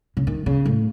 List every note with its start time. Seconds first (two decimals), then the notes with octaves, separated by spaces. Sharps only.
0.17 C#3
0.27 D#3
0.46 C#3
0.65 A2